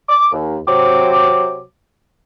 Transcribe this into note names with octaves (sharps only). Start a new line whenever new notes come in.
D6
D#2
C3 F#3 C4 C5 D6